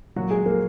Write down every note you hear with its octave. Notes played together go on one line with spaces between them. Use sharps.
A#2 F#3 F#4
G#3 G#4
F3
A#3 A#4